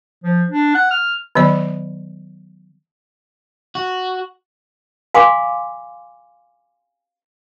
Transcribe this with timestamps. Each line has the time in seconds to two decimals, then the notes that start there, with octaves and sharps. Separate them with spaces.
0.24 F3
0.50 D4
0.75 F#5
0.91 F6
1.35 D#3 F#3 B3 D5
3.75 F#4
5.14 F5 G#5 C6 D6